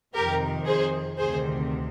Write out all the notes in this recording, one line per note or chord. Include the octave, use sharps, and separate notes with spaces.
F2 C3 D#3 G4 A#4
G#4 C5
D2 C3 D#3 G#4 C5